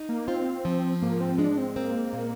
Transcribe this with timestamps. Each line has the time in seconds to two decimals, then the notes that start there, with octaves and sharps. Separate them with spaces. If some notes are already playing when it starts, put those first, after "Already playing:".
Already playing: D#4
0.09 A#3
0.27 C4 F4
0.65 F3
1.02 G#2 A#3
1.20 C4
1.38 G#3 D4
1.58 C4
1.76 A#3 C4
2.13 A#2